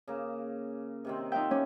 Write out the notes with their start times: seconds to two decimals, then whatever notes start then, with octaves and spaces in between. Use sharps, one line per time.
0.08 C#3 A#3
1.05 C3 D#3 C4
1.32 D#4 F4 E5 G5
1.51 C#4 D6